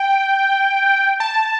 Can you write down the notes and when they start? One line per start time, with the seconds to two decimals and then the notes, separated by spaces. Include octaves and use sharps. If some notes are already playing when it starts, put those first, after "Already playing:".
Already playing: G5
1.20 A5